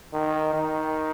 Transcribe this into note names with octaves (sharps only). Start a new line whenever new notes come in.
D#3
D#3